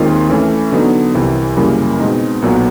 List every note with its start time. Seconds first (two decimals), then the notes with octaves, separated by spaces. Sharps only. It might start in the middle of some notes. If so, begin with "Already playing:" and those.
Already playing: D#2 D#3 G#3 C4 F4
0.30 E3 A3 C#4
0.72 D3 F#3 B3 D#4
1.14 C2 C3 E3
1.57 F#2 C#3 E3 G3 A#3
1.99 B2 G#3 C4 D#4
2.42 B1 A#2 F#3 B3